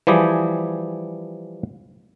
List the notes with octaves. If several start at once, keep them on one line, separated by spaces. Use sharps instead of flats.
E3 F3 G3 G4 G#4